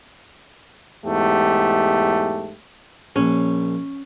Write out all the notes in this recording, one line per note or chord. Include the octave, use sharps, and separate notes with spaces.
E2 G#2 A3 G4
A#1 C#4